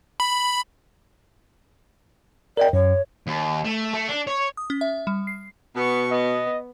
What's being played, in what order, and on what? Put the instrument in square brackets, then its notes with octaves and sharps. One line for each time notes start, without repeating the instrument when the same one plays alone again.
[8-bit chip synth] B5
[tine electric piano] A#4 D#5 G5 [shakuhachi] D5
[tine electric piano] F#2 [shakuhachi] C#5
[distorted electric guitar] D#2
A3
A3
D4
C#5
[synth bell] D#6
C#4
E5
G3
C7
[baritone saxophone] B2 [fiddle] B3 C#6
[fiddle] B3 [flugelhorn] D#5